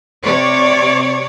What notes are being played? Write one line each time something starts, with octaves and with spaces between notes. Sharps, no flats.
C3 C#5 D5